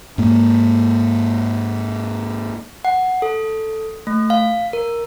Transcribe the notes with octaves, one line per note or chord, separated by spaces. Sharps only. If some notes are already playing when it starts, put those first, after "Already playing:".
G#2 A#3
F#5
A4
A3
F5
A#4